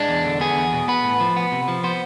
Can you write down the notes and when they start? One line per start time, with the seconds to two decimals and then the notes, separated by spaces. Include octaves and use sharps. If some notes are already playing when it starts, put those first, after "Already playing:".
Already playing: G#3 D4
0.09 E2
0.25 D3
0.41 B3 G#4
0.57 E2
0.73 B2
0.88 B3 B4
1.04 A2
1.20 F3
1.36 B3
1.52 C3
1.68 F3
1.84 B3 C5